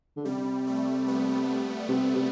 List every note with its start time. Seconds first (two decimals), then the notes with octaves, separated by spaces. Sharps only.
0.17 D3
0.25 C3 G3
0.67 A3
1.08 B3
1.89 C3
2.16 C3